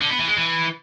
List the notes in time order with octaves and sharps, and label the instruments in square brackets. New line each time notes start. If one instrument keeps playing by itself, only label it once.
[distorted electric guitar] D3
B3
E3
G#3
E3